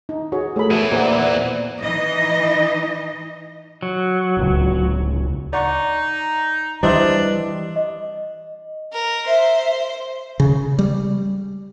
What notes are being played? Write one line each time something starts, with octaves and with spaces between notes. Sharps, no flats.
D#4
F#4 G#4 C#5
A3 G#4 A#4 C#5 B5
E2 E3 F#4 A4 D#7
A#2 C5 D5 F#5
E3 D#4 D#5
F#3
D1 C#2
D#4 D5 F#5 C#6
E3 G3 D4 C5 D#5 E5
D#5
A#4
C5 E5
C#3
G3